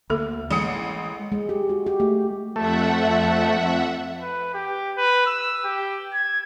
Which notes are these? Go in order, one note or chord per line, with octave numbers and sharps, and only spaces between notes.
D2 A#3 A4 B5
A1 G#3 D#6 C#7
G#3
G4
F#4
G4
A3
F2 A3 E5 F#5
B4
G4
B4
E6
G4
G#6